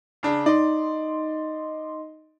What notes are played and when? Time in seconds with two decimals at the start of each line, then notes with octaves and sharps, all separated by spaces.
0.23 C#3 D4
0.46 D#4 D5 D#5 C6